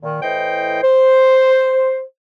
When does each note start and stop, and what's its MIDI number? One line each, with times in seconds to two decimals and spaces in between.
0.03 0.21 46
0.03 0.21 51
0.23 0.81 45
0.23 0.81 52
0.23 0.81 72
0.23 0.81 75
0.23 0.81 79
0.83 2.02 72